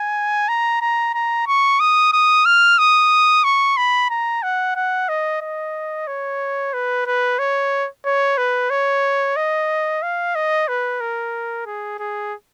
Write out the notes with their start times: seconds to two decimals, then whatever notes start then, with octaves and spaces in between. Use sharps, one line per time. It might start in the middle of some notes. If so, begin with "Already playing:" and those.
Already playing: G#5
0.48 A#5
0.81 A#5
1.14 A#5
1.47 C#6
1.80 D#6
2.13 D#6
2.45 F6
2.78 D#6
3.44 C#6
3.77 B5
4.10 A#5
4.43 F#5
4.76 F#5
5.09 D#5
5.41 D#5
6.07 C#5
6.73 B4
7.06 B4
7.39 C#5
8.05 C#5
8.37 B4
8.70 C#5
9.36 D#5
10.02 F5
10.35 D#5
10.68 B4
11.00 A#4
11.66 G#4
11.99 G#4